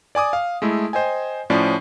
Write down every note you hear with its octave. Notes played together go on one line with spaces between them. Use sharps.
D5 G#5 D6 D#6
F5
G#3 A3 E4
C5 D#5 G5 G#5
A2 F3 C#4 D5